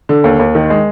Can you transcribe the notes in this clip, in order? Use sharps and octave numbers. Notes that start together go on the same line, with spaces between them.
D3
D#2
D#2
D#3
G#3